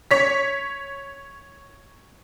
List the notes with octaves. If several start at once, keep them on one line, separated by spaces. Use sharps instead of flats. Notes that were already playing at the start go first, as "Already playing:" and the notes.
C#5 B6